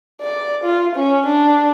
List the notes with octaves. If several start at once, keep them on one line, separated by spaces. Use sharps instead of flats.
D5
F4
C#4
D4